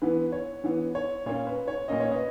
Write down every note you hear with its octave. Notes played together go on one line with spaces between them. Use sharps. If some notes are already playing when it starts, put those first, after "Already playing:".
E3 B3 B4
C#5
E3 B3
C#5
A#2 A#3 C#4 C#5
B4
C#5
A#2 A#3 C#4 D#5
C#5
B4 D#5